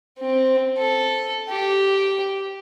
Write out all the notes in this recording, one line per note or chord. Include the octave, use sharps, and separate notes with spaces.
C4
A4
G4